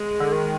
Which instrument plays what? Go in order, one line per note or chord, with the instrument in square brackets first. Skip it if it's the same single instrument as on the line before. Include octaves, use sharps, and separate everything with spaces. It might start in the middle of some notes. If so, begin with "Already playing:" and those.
Already playing: [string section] G#3
[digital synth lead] D3
D#3